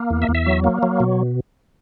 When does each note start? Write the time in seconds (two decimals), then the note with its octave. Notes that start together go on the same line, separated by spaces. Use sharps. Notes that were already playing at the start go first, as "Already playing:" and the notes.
Already playing: A#3
0.10 E2
0.22 E5
0.28 E2
0.35 E5
0.46 F#3
0.64 A#3
0.83 F#3
1.00 B2